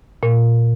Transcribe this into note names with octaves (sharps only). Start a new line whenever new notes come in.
A#2